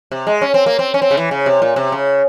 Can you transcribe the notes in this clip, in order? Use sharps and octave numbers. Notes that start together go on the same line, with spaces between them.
C3
G#3
C#4
C4
A#3
C4
C#4
C4
C#3
E3
C#3
C3
A#2
C3
C#3